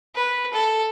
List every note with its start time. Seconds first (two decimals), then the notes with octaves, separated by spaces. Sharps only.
0.15 B4
0.53 A4